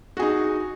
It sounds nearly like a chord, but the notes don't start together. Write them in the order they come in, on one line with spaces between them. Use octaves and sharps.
F#4 G#4 D#4